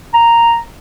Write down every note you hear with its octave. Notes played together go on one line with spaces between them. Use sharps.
A#5